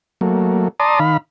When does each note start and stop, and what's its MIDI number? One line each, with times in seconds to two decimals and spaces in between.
0.21 0.68 54
0.21 0.68 57
0.21 0.68 58
0.80 0.99 74
0.80 0.99 81
0.80 0.99 82
0.80 0.99 84
0.80 0.99 87
0.99 1.17 51
0.99 1.17 77
0.99 1.17 83